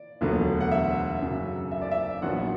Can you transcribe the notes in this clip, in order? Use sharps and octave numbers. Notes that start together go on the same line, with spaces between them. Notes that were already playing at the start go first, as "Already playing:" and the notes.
Already playing: D5
E1 D2 D3 F#3 B3
F#5
E5
F#2 C#3 F#3
E5
D5
E5
A#1 A#2 F#3 B3 F#5